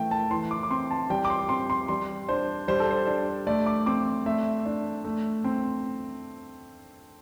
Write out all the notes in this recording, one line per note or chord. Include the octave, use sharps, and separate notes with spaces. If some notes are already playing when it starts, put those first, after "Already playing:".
Already playing: E3 A3 E5 G5
A5
E3 C6
D6
D6
C4 C6
A5
G3 G5
D6
C6
C4 C6
C6
G3 C6
D4 C5
G3 C5
A4
C5
D4
A3 D5
D6
C4 D6
A3 E5
D4
A3
C4